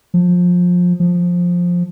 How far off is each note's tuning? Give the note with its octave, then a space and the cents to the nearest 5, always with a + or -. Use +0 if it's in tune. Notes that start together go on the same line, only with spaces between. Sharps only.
F3 +25
F3 +10